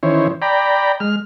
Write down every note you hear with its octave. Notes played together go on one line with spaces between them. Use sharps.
D#3 E3 C#4 E4 C5 C#5
D5 G5 A#5 B5
G#3 F6